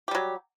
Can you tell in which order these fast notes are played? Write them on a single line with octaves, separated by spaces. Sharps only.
G4 G3 F#3